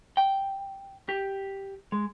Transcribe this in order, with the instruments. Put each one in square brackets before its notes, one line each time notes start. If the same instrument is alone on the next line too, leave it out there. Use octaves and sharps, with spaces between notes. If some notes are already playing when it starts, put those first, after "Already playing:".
[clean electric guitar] G5
G4
G#3